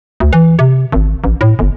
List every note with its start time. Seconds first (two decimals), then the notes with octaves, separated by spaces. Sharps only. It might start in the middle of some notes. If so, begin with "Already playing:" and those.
0.20 D2
0.33 E3
0.59 C3
0.92 G#1
1.24 A1
1.41 A2
1.59 G1